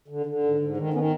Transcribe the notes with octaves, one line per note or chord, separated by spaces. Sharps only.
D3
D3
G#2
G#2
D#3
D#3 B3 C#4